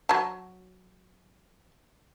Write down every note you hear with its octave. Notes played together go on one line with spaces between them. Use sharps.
F#3 A5